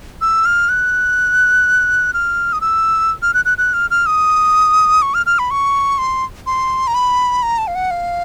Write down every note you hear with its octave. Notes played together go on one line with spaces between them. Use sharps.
E6
F6
F#6
F6
D#6
E6
F6
F#6
F#6
F#6
F6
F6
D#6
C#6
F6
F6
B5
C#6
C6
C6
A#5
B5
A#5
A5
F5
F#5
F5